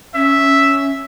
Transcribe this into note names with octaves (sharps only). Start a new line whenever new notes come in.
C#4 E5